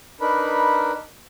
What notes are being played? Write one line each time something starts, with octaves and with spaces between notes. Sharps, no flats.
D4 D#4 A#4 B4 B5